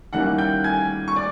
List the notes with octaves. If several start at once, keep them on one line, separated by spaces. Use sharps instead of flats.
D#3 G3 A#3 C#4 E4 F#5 F#6
G5 G6
G#5 G#6
C#6
D5 D6